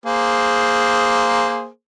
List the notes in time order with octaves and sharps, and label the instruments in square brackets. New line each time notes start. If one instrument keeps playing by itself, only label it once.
[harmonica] A#3 G#4 C5